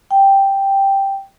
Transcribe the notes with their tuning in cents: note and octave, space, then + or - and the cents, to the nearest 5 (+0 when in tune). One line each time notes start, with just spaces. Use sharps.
G5 +0